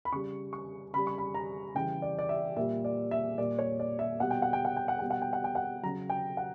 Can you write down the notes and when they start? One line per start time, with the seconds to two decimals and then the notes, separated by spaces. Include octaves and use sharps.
0.05 B5
0.12 C#3 G3 C#6
0.53 C#6
0.93 C#3 G3 B5
1.07 C#6
1.18 B5
1.35 A#5
1.75 C#3 E3 G3 G5
2.02 D5
2.19 D5
2.29 E5
2.56 A#2 G3 E5
2.85 D5
3.11 E5
3.38 A#2 G3 D5
3.59 C#5
3.80 D5
3.99 E5
4.20 B2 G3 F#5
4.31 G5
4.42 F#5
4.53 G5
4.65 F#5
4.77 G5
4.88 F#5
4.99 B2 G3 G5
5.10 F#5
5.22 G5
5.33 F#5
5.44 G5
5.55 F#5
5.83 C#3 F#3 A#5
6.10 G5
6.37 F#5